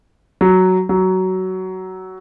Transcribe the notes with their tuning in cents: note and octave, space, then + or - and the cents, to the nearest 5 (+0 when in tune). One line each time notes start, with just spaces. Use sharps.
F#3 +5
F#3 +15